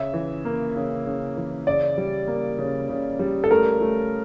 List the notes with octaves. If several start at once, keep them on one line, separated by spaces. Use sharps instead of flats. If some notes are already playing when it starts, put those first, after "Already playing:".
Already playing: C#3 E5
E3
A#3
C#3
C#3
E3
C#3 D5
G3
A#3
C#3
C#3
G3
A4
A3 A#4
A3